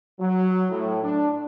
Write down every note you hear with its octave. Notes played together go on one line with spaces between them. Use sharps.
F#3
A2
D4